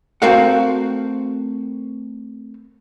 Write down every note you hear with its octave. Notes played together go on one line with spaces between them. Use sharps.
A3 C4 F#4 A#4 F5 F#5